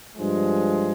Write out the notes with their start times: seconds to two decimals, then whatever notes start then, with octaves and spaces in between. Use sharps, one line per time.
0.16 G2 F3 G#3